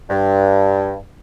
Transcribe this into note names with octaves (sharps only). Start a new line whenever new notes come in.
G2